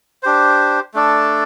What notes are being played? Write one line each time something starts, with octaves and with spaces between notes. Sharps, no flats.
D4 G4 C5
A3 D4 A4 D5